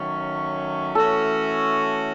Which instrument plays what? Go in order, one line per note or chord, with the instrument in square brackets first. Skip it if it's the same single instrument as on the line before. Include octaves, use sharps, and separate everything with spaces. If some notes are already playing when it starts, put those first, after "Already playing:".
Already playing: [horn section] D#3 F#3 A3 C#4
[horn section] E3 A3 C#4 F#4 [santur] A4